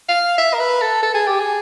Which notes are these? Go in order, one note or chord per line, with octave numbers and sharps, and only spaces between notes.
F5
E5
A#4
B4
A4
A4
G#4
G4
G#4